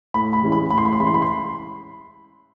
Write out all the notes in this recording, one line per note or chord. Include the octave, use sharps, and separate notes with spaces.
A2 B5
B5
E3 G#3 C#4 E4
B5
A2 B5
C6
B5
C6
E3 G#3 C#4 E4 B5
C6
B5
C6